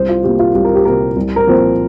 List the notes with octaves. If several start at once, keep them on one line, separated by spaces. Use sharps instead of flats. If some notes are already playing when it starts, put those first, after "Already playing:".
Already playing: C2 C5
F4
C3 A#3 G4
F4
C2 G4
A#4
G4
C3 A#3 A#4
C2
A#4
A#2 F3 C4